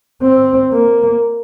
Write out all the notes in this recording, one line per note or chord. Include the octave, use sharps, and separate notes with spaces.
C4
A#3